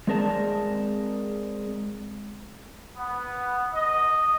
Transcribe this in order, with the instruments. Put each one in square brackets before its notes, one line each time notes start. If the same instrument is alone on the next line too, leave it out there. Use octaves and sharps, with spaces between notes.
[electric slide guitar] G#3 C4 G#4 A#4 D5 A5
[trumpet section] B3
D#5